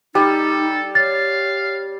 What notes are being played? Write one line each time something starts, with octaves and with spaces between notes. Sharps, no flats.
G3 D#4 A4
C#5 F5 A6